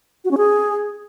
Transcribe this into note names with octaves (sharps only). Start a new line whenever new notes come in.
F#4
C#4
G#4